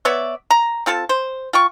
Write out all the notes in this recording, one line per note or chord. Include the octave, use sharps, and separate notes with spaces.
B3 C#5 D5 E5
A#5
C4 F4 A4 A5
C5
F4 G5 C#6